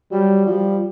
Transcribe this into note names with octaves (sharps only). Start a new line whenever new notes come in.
F#3 G3
F3 G3